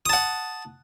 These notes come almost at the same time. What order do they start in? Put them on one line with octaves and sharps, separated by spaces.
D#6 A5 F#5